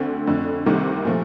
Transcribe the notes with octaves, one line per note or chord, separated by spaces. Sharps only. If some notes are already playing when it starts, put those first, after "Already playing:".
Already playing: D2 D3 A3 C4
F2 D3 A3
C2 C3 D#3 G3 A#3
A#2 F3 A3